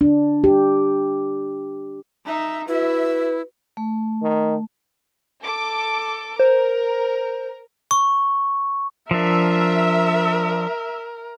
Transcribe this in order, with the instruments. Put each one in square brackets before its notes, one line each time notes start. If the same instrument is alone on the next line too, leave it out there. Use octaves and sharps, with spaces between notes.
[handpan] D4
G4
[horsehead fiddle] D#4 E5
[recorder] E4 [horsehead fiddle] F#4 E5 [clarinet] B4
[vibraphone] A3
[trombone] D#3
[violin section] A4 D6
[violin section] A#4 [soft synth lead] C5
[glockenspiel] C#6
[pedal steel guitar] F3 D4 [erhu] A#4 [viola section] E5